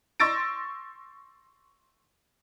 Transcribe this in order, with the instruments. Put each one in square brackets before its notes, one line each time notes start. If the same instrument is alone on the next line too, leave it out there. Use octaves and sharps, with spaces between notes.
[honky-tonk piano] C6 C#6 E6 A6 A#6 D7